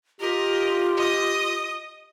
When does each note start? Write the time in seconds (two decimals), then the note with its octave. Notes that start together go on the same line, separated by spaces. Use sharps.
0.20 F4 G4 A#4 D#5
0.97 D#5 D#6